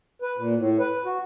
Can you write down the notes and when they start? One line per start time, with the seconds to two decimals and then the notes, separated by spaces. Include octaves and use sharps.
0.22 B4
0.37 A#2
0.57 A2
0.79 B4
1.05 F#4